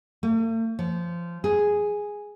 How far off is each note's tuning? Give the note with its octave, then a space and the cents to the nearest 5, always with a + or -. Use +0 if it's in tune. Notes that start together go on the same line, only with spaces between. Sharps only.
A3 +45
F3 -20
G#4 -5